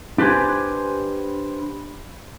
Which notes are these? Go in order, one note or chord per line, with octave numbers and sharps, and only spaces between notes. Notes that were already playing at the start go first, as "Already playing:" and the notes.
D4 G4 B4 C5 G#5